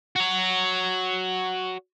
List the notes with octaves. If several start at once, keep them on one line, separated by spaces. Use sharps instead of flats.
F#4 C#5